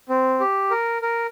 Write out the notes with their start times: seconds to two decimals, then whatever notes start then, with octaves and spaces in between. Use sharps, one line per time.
0.09 C4
0.40 G4
0.71 A#4
1.02 A#4